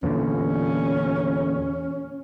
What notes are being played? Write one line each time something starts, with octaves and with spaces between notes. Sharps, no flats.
E2 A#2 D3 C#4